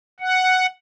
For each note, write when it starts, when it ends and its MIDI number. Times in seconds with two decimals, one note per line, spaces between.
0.20 0.66 78